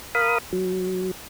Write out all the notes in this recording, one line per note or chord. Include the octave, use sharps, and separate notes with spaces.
A#4 F5 B5 D#6
F#3